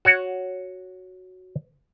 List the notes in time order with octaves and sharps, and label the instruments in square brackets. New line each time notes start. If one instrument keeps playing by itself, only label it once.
[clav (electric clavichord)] F#4 C#5 F#5